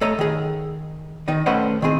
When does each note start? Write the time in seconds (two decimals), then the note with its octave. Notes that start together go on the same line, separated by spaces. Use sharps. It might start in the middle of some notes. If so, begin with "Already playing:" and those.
0.01 A3 A4 C#5 D#5 A#5
0.19 D#3 G#4
1.28 D#3 D#4 D#5
1.46 A3 C#4 B4 C5 D#5 F#5
1.82 D#3 E3 C4 G#4